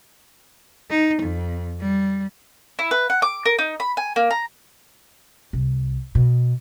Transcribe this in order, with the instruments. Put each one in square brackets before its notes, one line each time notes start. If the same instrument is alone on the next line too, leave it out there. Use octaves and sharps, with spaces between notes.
[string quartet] D#4
F2
G3
[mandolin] E4
B4
F#5
D6
A#4
D#4
B5
G#5
A#3
A#5
[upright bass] C2
B2